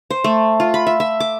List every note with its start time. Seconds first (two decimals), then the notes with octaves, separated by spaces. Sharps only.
0.10 C5
0.24 A3
0.60 F4
0.74 B5
0.87 E5
1.00 E5
1.20 D6